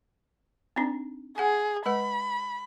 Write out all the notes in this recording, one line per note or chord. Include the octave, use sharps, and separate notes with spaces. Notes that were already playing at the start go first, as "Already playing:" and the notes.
C4 D4 D#4
G#4 F#5 G#5
G#3 B4 F#5 B5